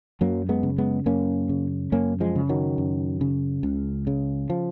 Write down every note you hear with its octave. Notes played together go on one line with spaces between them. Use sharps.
F#2 F#3 A#3
G#3 B3
C#3
G#3 B3
F#2 A#3 C#4
C#3
F#2 A#3 C#4
F3 G#3
C#3
D#3 F#3
F#2
C#3
C#2
C#3
F3